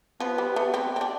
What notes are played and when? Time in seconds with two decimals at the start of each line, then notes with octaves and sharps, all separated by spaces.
0.20 F3 B3
0.38 G3
0.56 A3
0.74 C4
0.96 C4
1.01 D4